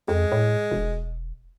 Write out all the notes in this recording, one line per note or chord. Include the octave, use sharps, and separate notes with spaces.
F2 G#3
A2
E1